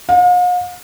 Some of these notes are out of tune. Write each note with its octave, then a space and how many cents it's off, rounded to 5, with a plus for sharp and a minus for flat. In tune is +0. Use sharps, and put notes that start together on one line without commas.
F5 +45